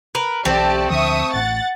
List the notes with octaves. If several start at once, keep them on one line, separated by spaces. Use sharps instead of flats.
A#4 B4
B1 E3 A3 C4 G4 D5 A5
D2 D3 F3 E5 C#6 D#6
A1 A2 F#5 A6